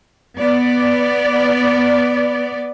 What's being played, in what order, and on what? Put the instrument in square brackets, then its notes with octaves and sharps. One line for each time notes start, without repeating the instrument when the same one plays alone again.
[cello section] B3 D5